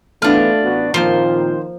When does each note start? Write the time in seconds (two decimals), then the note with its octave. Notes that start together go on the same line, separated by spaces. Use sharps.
0.22 E3 A3 B3 D4 F4 F6
0.62 A1 B3 F#4
0.94 A#2 D#3 F3 A#3 C4 F4 C5